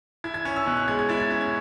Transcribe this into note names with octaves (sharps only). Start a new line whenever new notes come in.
E4 G#6
G#6
C#4 G#6
E6
B2 F#6
F#6
G#3 G#6
G#6
E4 A6
G#6
C#4 G#6
G#6